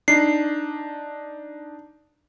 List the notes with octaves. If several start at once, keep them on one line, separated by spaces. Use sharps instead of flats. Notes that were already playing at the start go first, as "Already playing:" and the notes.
D4 D#4 C7